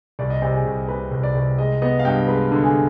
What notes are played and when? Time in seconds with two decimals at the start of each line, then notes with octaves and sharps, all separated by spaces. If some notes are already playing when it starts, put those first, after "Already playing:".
0.19 C2 D5
0.30 D#5
0.42 C3 D5
0.54 G#4
0.65 C2
0.88 C3 B4
1.11 C2
1.23 D5
1.35 C2
1.58 G#3 D#5
1.82 B3 D#5
1.99 F5
2.05 G2 G5
2.28 G#3 B4
2.51 D3
2.64 G#4